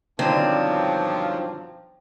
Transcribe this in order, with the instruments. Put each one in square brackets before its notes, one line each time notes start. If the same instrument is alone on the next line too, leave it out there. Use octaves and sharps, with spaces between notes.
[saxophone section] G2 B2 F3 [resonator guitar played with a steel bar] D3 D#3 [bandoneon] F#3 D4 [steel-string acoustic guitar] C4